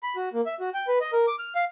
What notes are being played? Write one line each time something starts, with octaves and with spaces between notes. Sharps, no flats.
B5
F#4
A#3
E5
F#4
G5
B4
D#5
A#4
D6
F6
F5